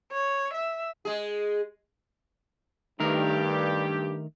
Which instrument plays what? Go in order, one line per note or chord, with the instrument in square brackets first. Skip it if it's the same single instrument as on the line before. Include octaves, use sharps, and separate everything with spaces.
[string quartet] C#5
E5
[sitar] G#3 G#4
[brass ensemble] G2 G4 [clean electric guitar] D#3 A3 A#4